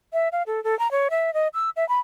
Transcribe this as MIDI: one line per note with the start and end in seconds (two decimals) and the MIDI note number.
0.13 0.29 76
0.32 0.43 77
0.47 0.63 69
0.64 0.77 69
0.79 0.91 82
0.91 1.08 73
1.11 1.33 76
1.34 1.48 75
1.54 1.70 88
1.76 1.87 76
1.89 1.99 83